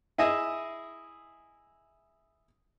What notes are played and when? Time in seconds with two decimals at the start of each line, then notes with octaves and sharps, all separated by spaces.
0.18 E4 G#4 D#5 E5